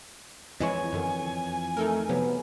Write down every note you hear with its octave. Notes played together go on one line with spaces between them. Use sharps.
F2 E3 G#3 E4 C#5 G#5
F#2 D3 D#3
A3 D#4 A4 A#4
C3 F3 F#3 B3